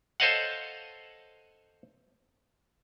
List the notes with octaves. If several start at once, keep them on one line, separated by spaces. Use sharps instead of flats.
A4 C5 C#5 D#5 F5 F#5